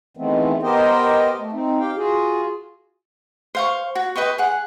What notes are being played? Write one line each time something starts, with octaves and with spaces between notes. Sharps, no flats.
D#3 E3 G#3 A3 B3 C4
B3 G4 A#4 C5 D#5 G5
A3
C4 D#4
G4 F5 G5
F4 F#4 G#4
C5 F5 C#6
F#4
B4 D#5 G5 C#6
G#4 F#5